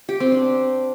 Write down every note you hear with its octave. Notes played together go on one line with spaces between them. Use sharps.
G4
C4
D4